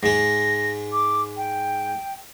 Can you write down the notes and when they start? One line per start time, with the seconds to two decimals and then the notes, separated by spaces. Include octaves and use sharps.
0.03 G#2 G#3 A#6
0.92 D6
1.37 G5